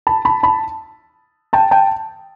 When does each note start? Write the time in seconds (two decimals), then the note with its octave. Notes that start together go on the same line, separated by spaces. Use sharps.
0.07 A5 B5
0.25 A5 B5
0.43 A5 B5
1.53 G5 A5
1.71 G5 A5